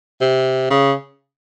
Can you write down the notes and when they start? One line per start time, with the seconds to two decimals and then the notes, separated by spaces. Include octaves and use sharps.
0.21 C3
0.70 C#3